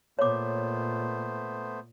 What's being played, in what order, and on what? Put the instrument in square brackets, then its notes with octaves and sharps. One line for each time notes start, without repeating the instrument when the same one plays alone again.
[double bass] A#2 [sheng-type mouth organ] A3 B3 C5 [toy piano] C#5 D6